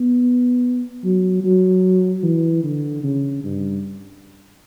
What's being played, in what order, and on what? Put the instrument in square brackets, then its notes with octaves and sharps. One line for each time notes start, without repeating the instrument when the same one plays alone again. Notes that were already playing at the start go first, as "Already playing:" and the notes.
Already playing: [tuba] B3
F#3
F#3
E3
D3
C#3
G2